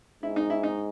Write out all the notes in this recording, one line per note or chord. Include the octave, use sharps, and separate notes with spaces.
G#2 E4
D#4
E4
D#4